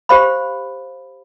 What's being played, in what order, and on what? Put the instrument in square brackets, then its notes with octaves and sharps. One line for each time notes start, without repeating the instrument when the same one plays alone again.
[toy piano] G4 C5 F5 B5